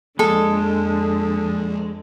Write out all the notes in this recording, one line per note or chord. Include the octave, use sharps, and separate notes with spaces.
F2 D3 F3 G#3 A#3 A4